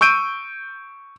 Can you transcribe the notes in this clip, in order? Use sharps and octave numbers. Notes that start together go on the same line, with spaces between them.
C#6 E6 G6 D7 D#7